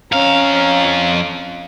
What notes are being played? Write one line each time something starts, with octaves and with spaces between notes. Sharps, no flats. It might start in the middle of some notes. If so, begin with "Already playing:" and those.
F2 C#4 F5 A#5